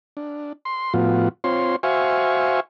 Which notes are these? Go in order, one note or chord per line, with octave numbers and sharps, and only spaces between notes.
D4
C6
A2 F3 B3 F4 F#4
C4 F4 C#5 C6
F#4 C5 E5 F5 G#5 C#6